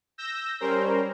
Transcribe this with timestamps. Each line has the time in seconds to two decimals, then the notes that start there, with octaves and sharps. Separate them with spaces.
0.18 E6 G6 A#6
0.60 G3 C#4 A#4 C5